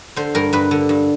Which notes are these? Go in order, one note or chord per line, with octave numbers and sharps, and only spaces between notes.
D3 C5
G2 A#4
G2 B4
D3
G2